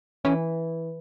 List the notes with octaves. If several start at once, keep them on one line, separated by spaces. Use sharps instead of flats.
E3 C#4